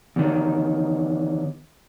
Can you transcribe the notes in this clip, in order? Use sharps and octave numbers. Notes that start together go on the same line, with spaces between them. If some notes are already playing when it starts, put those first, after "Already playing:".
E2 D#3